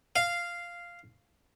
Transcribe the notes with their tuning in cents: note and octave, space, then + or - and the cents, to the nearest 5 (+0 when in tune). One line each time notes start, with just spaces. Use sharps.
F5 -5